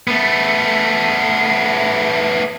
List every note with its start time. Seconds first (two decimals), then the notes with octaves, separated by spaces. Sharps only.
0.07 A3 B3